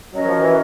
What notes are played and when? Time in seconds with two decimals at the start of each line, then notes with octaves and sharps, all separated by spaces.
0.12 F#3 C#4 F#4 A#4 D#5
0.26 F3
0.40 E3